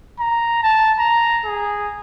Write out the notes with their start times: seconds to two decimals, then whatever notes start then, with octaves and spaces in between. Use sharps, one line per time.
0.20 A#5
0.63 A5
1.00 A#5
1.46 G#4